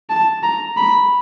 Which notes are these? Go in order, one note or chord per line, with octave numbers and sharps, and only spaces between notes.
A5
A#5
B5